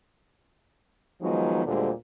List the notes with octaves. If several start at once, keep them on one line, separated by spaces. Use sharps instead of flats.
D#3 F3 F#3 G#3 B3 D#4
D2 A#2 D3 G3 G#3 C5